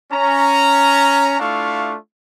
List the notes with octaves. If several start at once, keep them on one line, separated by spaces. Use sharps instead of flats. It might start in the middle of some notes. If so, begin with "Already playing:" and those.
C#4 A#5
A3 D4 E4 F4 F5 C#6